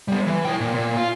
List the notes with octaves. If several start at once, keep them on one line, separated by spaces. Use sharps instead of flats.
G3 B3
E3
E4 G5
A#2
A#2
F4